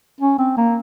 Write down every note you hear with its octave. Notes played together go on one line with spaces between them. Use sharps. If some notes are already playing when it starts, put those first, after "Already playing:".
C#4
C4
A#3